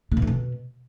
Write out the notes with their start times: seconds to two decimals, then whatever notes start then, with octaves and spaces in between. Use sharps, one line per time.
0.12 D3
0.17 B2
0.22 F2
0.27 B2